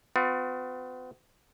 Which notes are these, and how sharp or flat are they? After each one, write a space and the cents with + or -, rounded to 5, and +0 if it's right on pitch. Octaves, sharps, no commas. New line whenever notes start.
B3 +45 F4 +40